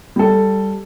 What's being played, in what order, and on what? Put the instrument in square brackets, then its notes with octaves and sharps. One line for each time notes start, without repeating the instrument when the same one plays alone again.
[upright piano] G3 A4